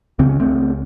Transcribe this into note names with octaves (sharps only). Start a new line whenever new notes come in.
C#2 C#3 C4
C#4
A3 C4